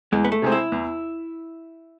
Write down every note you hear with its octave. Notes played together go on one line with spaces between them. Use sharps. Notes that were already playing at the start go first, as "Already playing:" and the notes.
E2 G#3
B3
A3
C3 G#3 C4
E4
E2